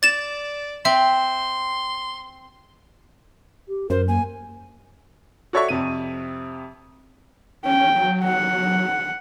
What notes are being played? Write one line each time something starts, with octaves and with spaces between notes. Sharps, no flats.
D5 A6 E7
C4 E5 C6
G4
F#2 A#4 C5
A#3 G#5
F#4 A4 C#5 D5 E5 C#6
F2 C3 D#7
C#4 G5
F#3
F#5